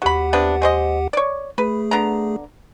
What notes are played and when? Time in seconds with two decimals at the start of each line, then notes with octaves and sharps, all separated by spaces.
0.02 D#2 F#3 G4 F#5 B5
0.33 C3 B3 D4
0.62 G#3 C5 D#5
1.13 C#5 D5
1.58 A3 G#4 B4
1.91 D3 B3 A#5